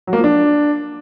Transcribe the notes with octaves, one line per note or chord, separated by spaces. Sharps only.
F#3
A#3
F3
D4